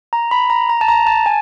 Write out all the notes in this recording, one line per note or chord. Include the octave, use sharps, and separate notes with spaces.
A#5
B5
A#5
A#5
A5
A#5
A5
G#5